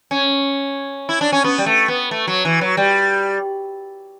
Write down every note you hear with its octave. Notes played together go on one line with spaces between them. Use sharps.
C#4
E4
D4
C#4
B3
G3
A3
B3
A3
F#3
E3
F#3
G3